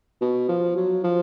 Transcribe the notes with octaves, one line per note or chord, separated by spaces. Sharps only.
B2
F3
F#3
F3